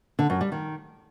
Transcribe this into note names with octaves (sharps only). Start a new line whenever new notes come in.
D3
F#2
G3
D#3